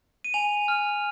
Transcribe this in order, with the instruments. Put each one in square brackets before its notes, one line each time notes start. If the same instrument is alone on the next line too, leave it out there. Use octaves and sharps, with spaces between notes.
[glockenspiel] D#7
G#5 F7
F6